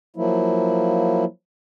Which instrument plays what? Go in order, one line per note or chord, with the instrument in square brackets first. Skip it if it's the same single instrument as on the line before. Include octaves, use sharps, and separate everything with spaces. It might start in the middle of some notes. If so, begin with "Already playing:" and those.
[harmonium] F3 F#3 A#3 E4